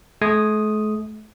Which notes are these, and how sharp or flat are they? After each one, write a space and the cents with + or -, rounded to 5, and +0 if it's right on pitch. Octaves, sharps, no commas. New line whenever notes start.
A3 -45 D#6 +0